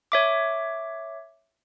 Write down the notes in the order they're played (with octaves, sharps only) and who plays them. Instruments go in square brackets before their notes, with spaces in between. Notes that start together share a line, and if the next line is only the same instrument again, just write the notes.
[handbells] C#5 E5 D6